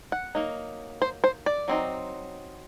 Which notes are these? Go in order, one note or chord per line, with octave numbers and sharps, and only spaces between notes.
F#5
F#3 A#3 D#4
C5
C5
D5
F#3 C4 D#4